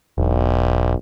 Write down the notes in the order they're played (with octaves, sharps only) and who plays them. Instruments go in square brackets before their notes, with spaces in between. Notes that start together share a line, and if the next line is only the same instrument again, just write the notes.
[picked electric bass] E1 [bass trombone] B1